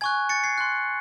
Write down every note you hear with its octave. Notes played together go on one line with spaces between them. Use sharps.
G#5 C#6 F#6 G#6
A6 C#7
G#6 C7
C6 F#6